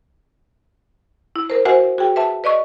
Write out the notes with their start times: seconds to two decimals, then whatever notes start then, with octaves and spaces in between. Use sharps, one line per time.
1.36 E4
1.50 A#4 C5
1.65 F#4 C5 E5 F#5 G#5
1.98 F#4 G#4 G5
2.16 B4 E5 A5
2.44 B4 D5 D#5 C#6